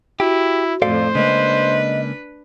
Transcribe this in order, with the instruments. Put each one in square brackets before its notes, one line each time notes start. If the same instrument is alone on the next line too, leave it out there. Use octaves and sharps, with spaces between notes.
[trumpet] E4 [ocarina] F#4 [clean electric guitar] G4
[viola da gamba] F2 A2 [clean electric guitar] A4 D5 F5 [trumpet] C5
[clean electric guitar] C#3 G#3 A#3 [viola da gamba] D4 B4 [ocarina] D#5